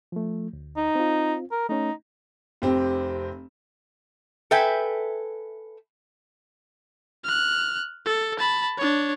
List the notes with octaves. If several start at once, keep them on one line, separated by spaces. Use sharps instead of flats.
F3 A3
D2
D#4
C4 F4
A#4
A3 C#4 D#4
F1 C4 G4
A4 B4 E5 G5 G#5
F6 F#6
A4
A5 B5
D4 C#5